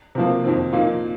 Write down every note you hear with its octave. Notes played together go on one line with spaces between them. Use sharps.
C3 F3 A#3
F2 D#3 C4
A#2 A#3 D#4